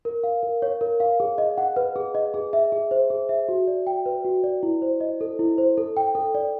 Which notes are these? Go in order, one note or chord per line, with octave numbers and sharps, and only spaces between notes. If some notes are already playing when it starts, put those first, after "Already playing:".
A#4
F5
A#4
C#5
A#4
F5
G#4
D#5
F#5
B4
G#4
D#5
G#4
E5
G#4
C5
G#4
E5
F#4
D5
G5
B4
F#4
D5
E4
C5
D#5
A4
E4
C5
A4
G5
A4
D5